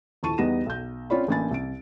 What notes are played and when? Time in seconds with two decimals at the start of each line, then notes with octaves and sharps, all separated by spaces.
0.23 D#1 E4 A5 C#6 D#7
0.38 E2 G3 B3 D#4 A#6 E7
0.66 B1 G6
1.10 C4 C#4 F4 C#5 D5 B5
1.28 A1 A#3 D4 G#5 B5 A6
1.51 C2 D7